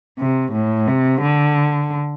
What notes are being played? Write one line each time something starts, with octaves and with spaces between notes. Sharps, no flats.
C3
A2
C3
D3